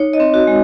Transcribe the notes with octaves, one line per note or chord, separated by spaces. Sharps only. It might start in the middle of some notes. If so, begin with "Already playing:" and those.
Already playing: D#4 C#5
D#5
C4
F#4
G#3